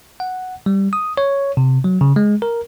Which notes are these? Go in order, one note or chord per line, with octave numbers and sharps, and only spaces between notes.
F#5
G3
D#6
C#5
C3
F#3
C#3
G#3
A#4